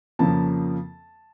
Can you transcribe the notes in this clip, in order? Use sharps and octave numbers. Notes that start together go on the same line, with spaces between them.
F2 C#3 F3 A#3 A5